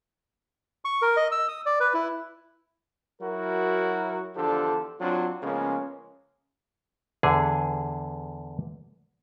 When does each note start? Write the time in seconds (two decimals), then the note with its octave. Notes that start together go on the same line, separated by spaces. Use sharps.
0.85 C#6
1.02 A#4
1.17 D#5
1.32 E6
1.48 D#6
1.66 D5
1.80 B4
1.94 E4
3.21 F#3 E4 F#4 A#4
4.35 E2 D3 F3 D4 G4 A4
5.00 F#3 C4 D4 F4
5.42 C#3 F3 G#3 A#3 B3 C#4
7.23 E2 D3 G#4 G#5